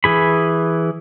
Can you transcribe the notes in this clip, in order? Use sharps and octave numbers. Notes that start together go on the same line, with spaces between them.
E3 G#4 B5